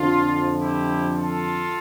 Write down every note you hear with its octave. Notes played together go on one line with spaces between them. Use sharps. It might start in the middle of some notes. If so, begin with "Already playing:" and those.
Already playing: F2 D3 F3 D4 F4
E4 G4
F4 A4